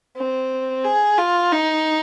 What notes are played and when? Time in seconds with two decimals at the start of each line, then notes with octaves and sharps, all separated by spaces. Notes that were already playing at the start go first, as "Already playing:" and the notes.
0.17 C4
0.84 G#4
1.18 F4
1.52 D#4